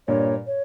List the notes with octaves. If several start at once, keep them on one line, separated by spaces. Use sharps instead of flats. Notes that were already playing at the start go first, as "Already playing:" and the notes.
G2 A#2 C#5
C#5